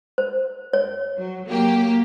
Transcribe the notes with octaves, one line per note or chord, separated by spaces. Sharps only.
C5
C#5
F#3
F#3 A#3 G4